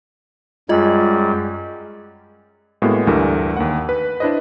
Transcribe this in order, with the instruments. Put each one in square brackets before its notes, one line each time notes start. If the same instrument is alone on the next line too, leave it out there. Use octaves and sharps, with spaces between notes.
[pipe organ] F#2 G3 [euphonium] G#3 [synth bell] F4 D#5
[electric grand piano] A2 G#3 A#3 B3 F#4
D2 G2 E3 A3 G4 A#4
D#2 A#3 F#5
B4
D4 E4 B4 C5 D#5